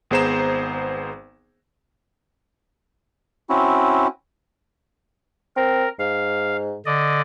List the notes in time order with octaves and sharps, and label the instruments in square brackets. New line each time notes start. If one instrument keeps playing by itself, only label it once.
[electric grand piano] G#1 B3 G#4 C5 A#5 E7
[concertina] C4 C#4 E4 F#4
[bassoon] C4 [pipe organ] A#4
[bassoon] G#2 [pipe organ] F5
[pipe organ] D3 D5 D#5